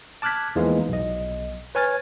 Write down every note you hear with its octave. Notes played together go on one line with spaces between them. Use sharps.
A5 D6 F6 F#6 G#6 B6
E2 E3 F3 G#3 A#3 D#4
B1 D#5
B4 C#5 G#5 F6 G#6 A6